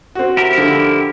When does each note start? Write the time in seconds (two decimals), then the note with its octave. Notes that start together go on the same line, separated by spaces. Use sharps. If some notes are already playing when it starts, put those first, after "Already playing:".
0.15 C4 F#4
0.37 E4 G4 A#4
0.58 D3 F3